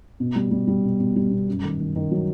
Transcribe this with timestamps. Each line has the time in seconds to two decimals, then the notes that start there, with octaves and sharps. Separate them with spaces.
0.20 B2
0.36 G3
0.51 G3
0.68 G3
0.84 B2
1.00 B2
1.16 G3
1.31 B2
1.48 F#2
1.64 D#3
1.80 D#3
1.96 D#3
2.11 F#3